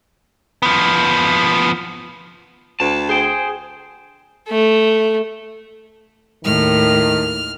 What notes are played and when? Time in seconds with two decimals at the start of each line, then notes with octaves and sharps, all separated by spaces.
0.62 F3 B3
2.80 D2 A5
3.09 G#4 C5 G5
4.48 A3
6.44 D#2 A2 D#3 F6